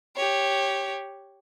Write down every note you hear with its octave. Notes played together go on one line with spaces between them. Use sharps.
G4 C#5